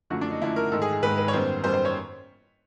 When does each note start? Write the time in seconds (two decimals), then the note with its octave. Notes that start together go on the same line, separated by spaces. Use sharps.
0.10 F#2 D3 F3 A3 F#4
0.21 D4
0.31 D#4
0.42 F#2 D3 F3 A3 E4
0.56 A#4
0.72 G#2 D#3 G#3 A4
0.82 G#4
0.93 G#4
1.03 G#2 D#3 G#3 B4
1.18 B4
1.28 C#5
1.33 F#2 D#3 G3 B3 C5
1.63 F#2 D#3 G3 B3 C5
1.73 C5
1.85 C#5